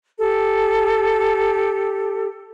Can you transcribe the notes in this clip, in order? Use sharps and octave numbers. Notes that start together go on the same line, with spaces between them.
G4 A4